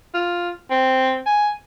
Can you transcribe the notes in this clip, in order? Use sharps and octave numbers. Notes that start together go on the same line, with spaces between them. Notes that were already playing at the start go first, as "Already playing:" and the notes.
F4
C4
G#5